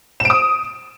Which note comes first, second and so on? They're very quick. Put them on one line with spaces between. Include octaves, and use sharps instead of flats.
E7 D7 D#6